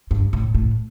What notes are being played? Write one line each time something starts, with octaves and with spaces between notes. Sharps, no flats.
G2
A2
A2